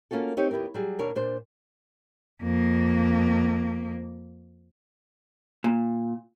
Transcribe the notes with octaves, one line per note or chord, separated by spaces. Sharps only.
A#3 C#4 F4 F#4 A4
C4 D#4 G4 C#5
D#2 B3 E4 G4 A#4
F#3 G3 G#4
D#2 B2 D4 A#4 C#5
A#2 D4 C5
F2 A#3
A#2